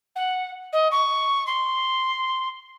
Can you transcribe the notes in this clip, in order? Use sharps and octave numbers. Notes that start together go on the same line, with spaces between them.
F#5
D#5
C#6
C6